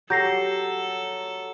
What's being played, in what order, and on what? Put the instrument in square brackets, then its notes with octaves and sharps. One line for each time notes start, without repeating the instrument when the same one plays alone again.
[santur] F#3 [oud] G4 [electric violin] A4 [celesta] G6 A#6 C7